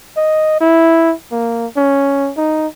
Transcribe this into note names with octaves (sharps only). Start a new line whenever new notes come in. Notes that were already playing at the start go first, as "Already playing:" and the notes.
D#5
E4
A#3
C#4
D#4